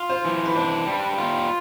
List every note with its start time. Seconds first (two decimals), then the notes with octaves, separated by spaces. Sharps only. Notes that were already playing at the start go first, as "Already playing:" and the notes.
Already playing: F4
0.10 C5
0.25 E3
0.46 B4
0.55 D4 C5
0.87 G3
1.18 F4